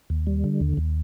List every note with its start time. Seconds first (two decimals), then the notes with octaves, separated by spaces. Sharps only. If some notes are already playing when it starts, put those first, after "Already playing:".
0.10 D#2
0.27 G3
0.44 D3
0.61 D#2
0.77 D#2